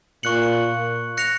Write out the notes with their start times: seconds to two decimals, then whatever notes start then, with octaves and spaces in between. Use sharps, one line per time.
0.23 A#2 C#6 F#6 C#7 F#7
1.17 F#6 A#6 C#7 F7